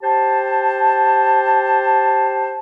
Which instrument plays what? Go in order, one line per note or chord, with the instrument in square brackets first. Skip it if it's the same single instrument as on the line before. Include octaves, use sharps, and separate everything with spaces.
[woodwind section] G4 C5 A5